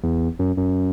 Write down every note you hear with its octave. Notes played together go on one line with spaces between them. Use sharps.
E2
F#2
F#2